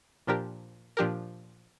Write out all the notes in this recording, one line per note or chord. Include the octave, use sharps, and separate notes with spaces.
A#2 F3 D4 G4 A#4
A#2 F3 D4 G4 A#4